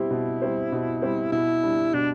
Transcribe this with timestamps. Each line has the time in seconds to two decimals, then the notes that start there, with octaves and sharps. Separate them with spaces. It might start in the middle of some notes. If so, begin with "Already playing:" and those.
Already playing: B2 G3 C4 E4 G4 C5
0.11 B2
0.42 G3 C4 G4 C5
0.72 B2
1.02 G3 C4 G4 C5
1.32 B2 E4
1.63 G3 D4
1.93 B2 D4